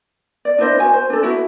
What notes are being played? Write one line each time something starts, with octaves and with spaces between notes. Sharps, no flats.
D5
D4 E4 C5 D#5
F#4 C5 G#5
C5
D4 A4
E4 F#4